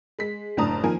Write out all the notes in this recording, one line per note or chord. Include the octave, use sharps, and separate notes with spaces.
G#3 B6
F#1 A2 D4 A5 A#5 D#6
D#3 F3 A#3 A#4 G#5